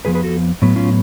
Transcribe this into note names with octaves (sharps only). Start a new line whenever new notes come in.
F2 F3 B3 G#4 B4
G#4 B4
F#4 A4
A2 F#3 B3
C#4 F4